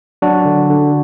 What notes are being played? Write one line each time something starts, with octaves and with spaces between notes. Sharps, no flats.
F#3 D4 F#4
D3
D3